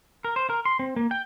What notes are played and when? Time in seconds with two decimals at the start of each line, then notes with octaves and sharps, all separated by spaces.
0.25 A#4
0.36 C5
0.50 A#4
0.65 C6
0.79 C4
0.96 A#3
1.11 G5